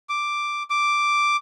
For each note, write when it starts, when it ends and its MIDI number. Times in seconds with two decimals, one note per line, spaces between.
0.09 0.63 86
0.70 1.36 86